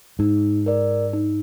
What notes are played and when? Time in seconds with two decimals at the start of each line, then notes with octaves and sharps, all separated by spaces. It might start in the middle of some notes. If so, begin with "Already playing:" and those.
0.19 G#2 D#4
0.66 A#4 D5
1.13 D#4